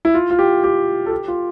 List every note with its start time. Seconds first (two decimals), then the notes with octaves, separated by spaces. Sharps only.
0.05 E4
0.14 F4
0.30 F4
0.39 G4
0.64 G4
1.06 A4
1.12 G4
1.28 F4